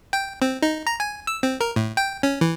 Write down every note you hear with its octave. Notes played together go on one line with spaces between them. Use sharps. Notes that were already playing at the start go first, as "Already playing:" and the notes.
G5
C4
D#4
A#5
G#5
E6
C4
A#4
A2
G5
C#4
E3